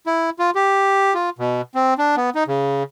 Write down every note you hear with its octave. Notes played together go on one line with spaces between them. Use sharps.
E4
F4
G4
F4
B2
C4
D4
B3
D#4
C#3